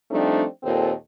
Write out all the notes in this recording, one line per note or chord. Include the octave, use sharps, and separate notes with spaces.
F3 G3 A3 C4 D4 D#4
D#2 A#2 C4 A4